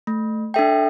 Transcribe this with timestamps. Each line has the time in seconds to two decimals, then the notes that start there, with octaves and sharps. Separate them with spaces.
0.07 A3
0.54 D4 A4 E5 G5